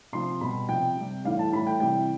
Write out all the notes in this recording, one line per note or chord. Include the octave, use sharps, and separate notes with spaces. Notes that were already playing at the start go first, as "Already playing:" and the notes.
C3 F3 C6
B2 G3 B5
C3 F3 G5
C3 G3
A2 E3 G3 F5
A5
A2 E3 G3 B5
G5
C3 E3 G3 G5